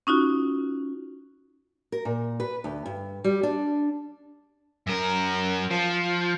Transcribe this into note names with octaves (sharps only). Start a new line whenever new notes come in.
C#4 D#4 F4 F#4
A#4
A#2
B4
D2
G2
G3
D4
F#2 A#4
F3